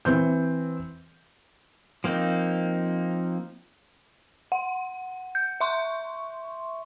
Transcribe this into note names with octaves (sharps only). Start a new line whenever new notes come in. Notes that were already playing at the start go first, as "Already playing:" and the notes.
E3 C4 G6
F3 A#3 C4 D#4
F#5
G6
E5 C6 C#6